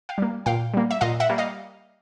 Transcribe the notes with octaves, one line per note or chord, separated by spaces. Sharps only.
F5 G5
G3 A#3
A#2 F5 G5
G3 A#3
E5
A#2 D#5 F5
E5 F#5
G3 A#3
D#5 F5